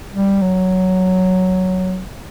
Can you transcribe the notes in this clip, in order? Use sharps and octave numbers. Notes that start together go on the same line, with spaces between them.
G3
F#3